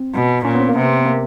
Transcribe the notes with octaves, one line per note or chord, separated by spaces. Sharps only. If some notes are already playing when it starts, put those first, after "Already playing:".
Already playing: C4
B2
A#2 C#4
B3
C4
A#3
C3 B3
A#3